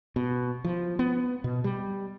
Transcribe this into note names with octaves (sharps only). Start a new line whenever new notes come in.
B2
F3
B3
B2
G3